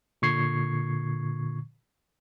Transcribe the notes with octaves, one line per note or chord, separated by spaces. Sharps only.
A#2 D3 C#6 G#6 C7